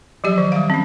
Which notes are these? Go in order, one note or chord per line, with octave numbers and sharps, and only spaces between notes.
F3 F#3 G4 D5
D#3 D5
G3 F5
C4 C#4